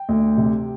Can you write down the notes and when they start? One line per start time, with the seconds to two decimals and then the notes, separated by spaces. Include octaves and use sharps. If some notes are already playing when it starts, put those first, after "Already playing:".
Already playing: G5
0.09 D2
0.37 C3